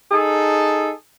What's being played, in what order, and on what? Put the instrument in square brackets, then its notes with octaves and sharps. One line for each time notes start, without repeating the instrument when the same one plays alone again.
[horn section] D#4 G#4 A4